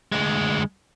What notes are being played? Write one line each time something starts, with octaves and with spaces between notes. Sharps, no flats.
D2 G#3